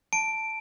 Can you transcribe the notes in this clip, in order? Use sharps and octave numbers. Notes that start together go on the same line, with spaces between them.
A5 D7